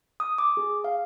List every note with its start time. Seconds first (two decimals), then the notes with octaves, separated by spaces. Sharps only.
0.20 D#6
0.38 D6
0.57 G#4
0.84 F5